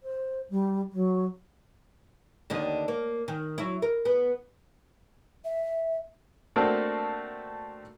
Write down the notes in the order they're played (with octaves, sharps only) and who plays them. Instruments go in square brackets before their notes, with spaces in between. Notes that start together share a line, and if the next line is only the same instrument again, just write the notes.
[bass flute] C5
G3
F#3
[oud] D#2 D3 D#5
A#3
D#3
F#3 E4
A#4
B3
[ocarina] E5
[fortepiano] A3 A#3 C4 D4 F#4 A4